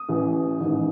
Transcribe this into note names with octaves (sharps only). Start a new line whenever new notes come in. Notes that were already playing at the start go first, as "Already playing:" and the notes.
Already playing: D#6
A1 A2 E3
A1 G#2 D#3